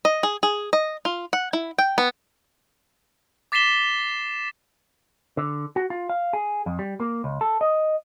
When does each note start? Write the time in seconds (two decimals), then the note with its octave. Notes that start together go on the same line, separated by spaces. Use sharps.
0.05 D#5
0.23 G#4
0.43 G#4
0.73 D#5
1.05 F4
1.33 F#5
1.53 E4
1.78 G5
1.98 B3
3.52 D6 A6 B6 C7 E7 G7
5.37 D3
5.76 F#4
5.90 F4
6.09 F5
6.33 G#4
6.66 F2
6.79 G3
7.00 A#3
7.24 C#2
7.41 A4
7.61 D#5